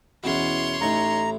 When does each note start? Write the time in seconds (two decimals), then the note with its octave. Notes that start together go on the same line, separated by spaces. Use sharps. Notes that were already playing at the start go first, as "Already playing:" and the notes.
0.24 E2 B2 E3 C#4 C#5 C6
0.81 A1 A2 D#4 A#5 C#6